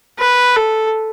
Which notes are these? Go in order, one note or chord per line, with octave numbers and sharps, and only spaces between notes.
B4
A4